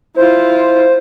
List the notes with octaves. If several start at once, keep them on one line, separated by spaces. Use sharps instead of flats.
E4 F4 C5